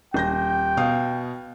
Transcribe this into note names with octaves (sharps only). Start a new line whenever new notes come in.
D#1 G5 G6 A#6
B2 F5 D#6